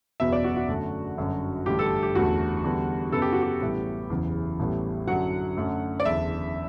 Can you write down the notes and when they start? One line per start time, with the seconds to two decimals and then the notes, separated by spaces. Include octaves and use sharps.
0.20 F#1 E2 B2 F#3 B3 E5
0.32 D5
0.44 F#4
0.56 F#4
0.68 F#2 D3 A3
1.18 G1 F#2 D3
1.66 A1 G2 D3 A3 G4
1.79 A4
2.03 G4
2.15 F#1 E2 D3 F#3 A3 F#4
2.64 E2 D3 G3 B3
3.12 F#2 C#3 F#3 B3 A4
3.22 G4
3.32 F#4
3.42 G4
3.61 A1 A2 G3 B3
4.10 F#1 E2 C#3 E3
4.59 A1 A2 G3 B3
5.07 F#2 D3 F#3 F#5
5.57 F#2 D3 A3
6.00 D5
6.05 F#1 E2 D3 E5